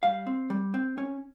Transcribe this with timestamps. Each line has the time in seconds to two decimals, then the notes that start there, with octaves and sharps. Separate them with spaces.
0.03 G3 F5
0.27 C4
0.50 G3
0.74 C4
0.98 C#4